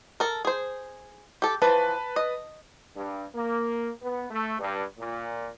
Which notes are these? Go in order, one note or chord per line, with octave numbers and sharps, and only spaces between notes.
A4 A#4
G#4 C5
G4 A4
E3 F3 B4 A5
D#5
G2
A#3
B3
A3
G2
A#2